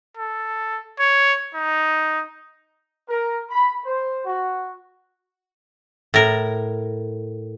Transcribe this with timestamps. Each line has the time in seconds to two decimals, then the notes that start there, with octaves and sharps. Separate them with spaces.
0.17 A4
0.99 C#5
1.54 D#4
3.08 A#4
3.50 B5
3.85 C5
4.25 F#4
6.14 A2 A#4